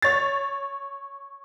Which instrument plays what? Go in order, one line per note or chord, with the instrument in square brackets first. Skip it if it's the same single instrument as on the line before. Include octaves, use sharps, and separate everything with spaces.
[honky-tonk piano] C#5 A6